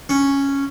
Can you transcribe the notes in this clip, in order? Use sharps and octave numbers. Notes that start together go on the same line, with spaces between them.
C#4